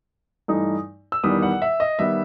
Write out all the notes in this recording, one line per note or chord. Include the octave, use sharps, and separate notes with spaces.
G2 E3 A3 D#4
E6
E2 D#3 G3 B3 D#6
F#5
E5
D#5
D#3 G3 B3 E5